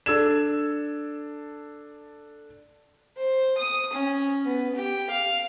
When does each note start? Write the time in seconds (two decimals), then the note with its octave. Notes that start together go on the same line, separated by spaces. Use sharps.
0.06 D4 A4 E6 G#6 E7
3.17 C5
3.58 D#6
3.93 C#4
4.45 B3
4.76 G4
5.10 F5